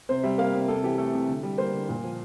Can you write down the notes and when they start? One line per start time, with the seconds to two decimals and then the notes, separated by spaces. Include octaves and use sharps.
0.09 C3 C5
0.23 G3 E5
0.38 A#3 F5
0.53 C3
0.68 C3 A4
0.83 E3 G4
0.98 A3 A4
1.13 C3
1.28 D3
1.43 G3
1.58 A#3 C5
1.73 D3
1.89 A#2
2.03 F3